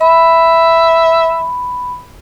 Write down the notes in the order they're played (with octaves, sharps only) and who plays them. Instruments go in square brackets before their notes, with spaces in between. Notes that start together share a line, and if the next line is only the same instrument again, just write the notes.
[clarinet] E5 [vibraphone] B5